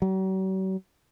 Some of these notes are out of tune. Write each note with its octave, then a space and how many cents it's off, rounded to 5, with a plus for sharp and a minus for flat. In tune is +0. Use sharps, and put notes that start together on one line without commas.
F#3 +45